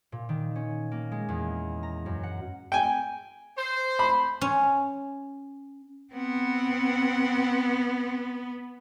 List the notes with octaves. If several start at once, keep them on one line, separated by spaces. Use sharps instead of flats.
A#2
D#3
C#4
A#3
G#3
E2
A#5
F#2
F#5
G5 G#5
C5
B5
C#4
B3 C4 F#5